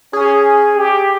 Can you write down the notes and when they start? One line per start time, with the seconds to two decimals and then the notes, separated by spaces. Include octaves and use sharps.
0.13 C#4 G#4
0.75 G4